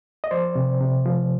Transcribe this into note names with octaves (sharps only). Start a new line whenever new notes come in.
D#5
F3 C5 D5
C3
C3
F3